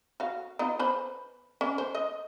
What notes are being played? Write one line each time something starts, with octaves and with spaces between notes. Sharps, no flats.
F#4 F5
B3 D#4 F4
B4 C5 B5
C#4
C5
D#5